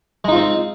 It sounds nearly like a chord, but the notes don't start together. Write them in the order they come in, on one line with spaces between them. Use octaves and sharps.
G#3 D#4 F4 C4